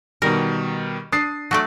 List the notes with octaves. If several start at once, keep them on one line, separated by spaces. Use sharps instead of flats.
B2 D#3 G3 A#4
D4 D#6 A6 C7
F#3 A3 D5